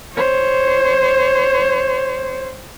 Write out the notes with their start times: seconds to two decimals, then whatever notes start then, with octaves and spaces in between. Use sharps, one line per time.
0.14 C5 C#5